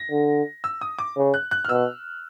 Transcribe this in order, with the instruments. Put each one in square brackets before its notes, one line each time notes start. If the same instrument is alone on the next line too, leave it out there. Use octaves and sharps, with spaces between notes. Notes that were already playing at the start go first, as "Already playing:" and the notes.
Already playing: [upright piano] A#6
[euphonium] D3
[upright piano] E6
D#6
D6
[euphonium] C#3
[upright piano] F#6
F#6
F6
[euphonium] B2 [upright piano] E6